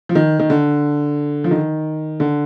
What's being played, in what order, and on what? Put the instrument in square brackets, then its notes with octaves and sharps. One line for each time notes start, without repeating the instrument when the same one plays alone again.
[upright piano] F3
D#3
D#3
D3
F3
D#3
D3